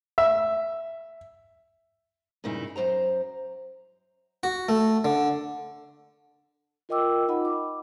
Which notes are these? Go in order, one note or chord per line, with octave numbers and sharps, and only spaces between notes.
E5
G2 A#2 C#3 D#4 E4
F#2 D#3 C5 A#5
F#4
A3
D3
F4 A#4 D#5 G5 D6 E6
D#4 F4 D#5 F#5 B5
D6